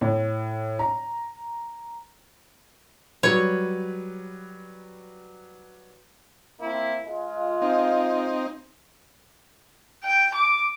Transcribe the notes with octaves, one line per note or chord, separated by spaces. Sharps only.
A2
A#5
F#3 G3 B4 C#5
A#3 C4 E4
G#3 F4
C4 D#4
G5
D6